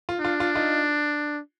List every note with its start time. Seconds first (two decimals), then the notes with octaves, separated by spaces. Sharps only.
0.09 F4
0.20 D4 F4
0.40 F4
0.55 D#4 F4